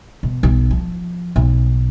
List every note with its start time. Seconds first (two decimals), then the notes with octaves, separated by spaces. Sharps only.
0.23 B2
0.43 B1
0.71 F3
1.36 B1